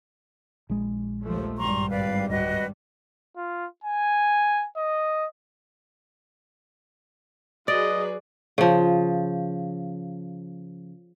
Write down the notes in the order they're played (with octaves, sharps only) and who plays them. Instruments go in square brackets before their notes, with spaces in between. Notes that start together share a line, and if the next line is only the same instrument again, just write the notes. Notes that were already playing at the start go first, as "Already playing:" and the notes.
[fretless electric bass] A#1 G#3
[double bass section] D#2 F3 A3
[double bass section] G#1 G2 G3 [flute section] A#5 C6 C#6
[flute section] B4 D5 F5
[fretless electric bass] D1 [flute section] F#4 B4 D#5
[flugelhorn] F4
G#5
D#5
[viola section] F#3 G#4 B4 [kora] D5 [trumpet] D#5
[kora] C#3 F3